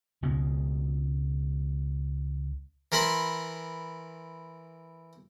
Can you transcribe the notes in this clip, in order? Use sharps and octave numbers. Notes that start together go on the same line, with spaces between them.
C#2 B2 G#3
E3 A#4 A5 B5 C6